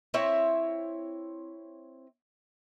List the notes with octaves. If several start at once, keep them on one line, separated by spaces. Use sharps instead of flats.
C4 E4 C#5 E5